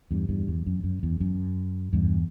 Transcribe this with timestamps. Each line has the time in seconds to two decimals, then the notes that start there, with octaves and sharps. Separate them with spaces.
0.11 E2 G2
0.29 E2 G2
0.48 E2
0.66 F#2
0.84 F#2
1.03 E2
1.20 F#2
1.93 E2 G2